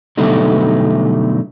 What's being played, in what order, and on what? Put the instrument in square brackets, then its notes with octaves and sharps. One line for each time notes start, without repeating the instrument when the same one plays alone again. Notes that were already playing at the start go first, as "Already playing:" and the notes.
[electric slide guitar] B2 D3 F#3 G3 A3 D#4